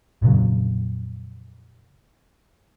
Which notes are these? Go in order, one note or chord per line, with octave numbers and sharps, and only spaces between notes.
F2 A#2 C#3 F#3